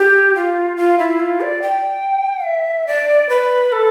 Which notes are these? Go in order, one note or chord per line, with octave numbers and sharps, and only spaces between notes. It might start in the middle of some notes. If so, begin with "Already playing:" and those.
Already playing: G4
F4
F4
E4
F4
D5
G5
E5
D5
B4
A4